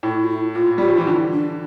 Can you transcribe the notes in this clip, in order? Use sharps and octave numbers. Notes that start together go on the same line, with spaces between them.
A2 E4
F4
E4
A#2 F4
G3 G4
F3
E3 F4
D3 E4
D4